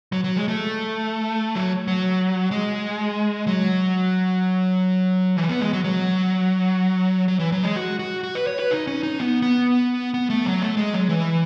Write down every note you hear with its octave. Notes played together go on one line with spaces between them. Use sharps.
F#3
F#3
G#3
A3
F#3
F#3
G#3
F#3
E3
B3
G#3
F#3
F#3
F#3
E3
F#3
G#3
F#4
F#4
F#4
B4
C#5
B4
D#4
C#4
D#4
B3
B3
B3
A3
F#3
A3
G#3
F#3
E3